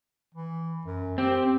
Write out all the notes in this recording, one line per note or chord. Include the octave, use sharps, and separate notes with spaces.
E3
F#2
C4 G4